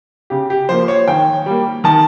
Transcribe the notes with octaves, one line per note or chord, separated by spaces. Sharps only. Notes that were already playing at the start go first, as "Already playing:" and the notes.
C#3 G4
G4
F3 A#3 C5
C#5
D#3 G5
G3 A#3
D#3 A5